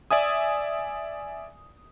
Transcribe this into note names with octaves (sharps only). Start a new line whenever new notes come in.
D5 E5 G#5 D#6